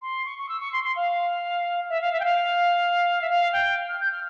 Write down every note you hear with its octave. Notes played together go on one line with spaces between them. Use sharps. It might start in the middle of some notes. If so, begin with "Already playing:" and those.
C6
C#6
C#6
E6
C#6
C6
C6
F5
E5
F5
E5
G5
F5
E5
F5
G5
F6
G6
F6